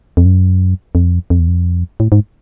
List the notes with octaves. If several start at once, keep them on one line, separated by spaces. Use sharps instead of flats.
F2
F#2
F2
F2
E2
F2
A2
G#2